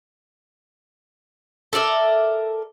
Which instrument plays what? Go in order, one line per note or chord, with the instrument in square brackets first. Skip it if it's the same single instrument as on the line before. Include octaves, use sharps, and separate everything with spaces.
[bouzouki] A4 A#4 D5 E5